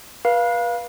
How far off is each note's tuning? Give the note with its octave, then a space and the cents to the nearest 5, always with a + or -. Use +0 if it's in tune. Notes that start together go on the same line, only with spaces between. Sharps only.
B4 -35 F5 +0